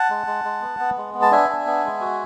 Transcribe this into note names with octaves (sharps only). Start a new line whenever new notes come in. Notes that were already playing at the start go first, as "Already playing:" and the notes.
Already playing: F#5 A5
G#3
G#3
G#3
B3
B3
G#3
B3
A5
D4 E5 G#5
D4
B3
G#3
F#4